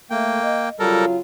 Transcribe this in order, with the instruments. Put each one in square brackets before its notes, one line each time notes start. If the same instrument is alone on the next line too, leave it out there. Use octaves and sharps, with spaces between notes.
[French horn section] A3 [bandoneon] A#3 G5
[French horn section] D#5
[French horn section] C#3 F#3 F4 [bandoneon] G3 A4 A#4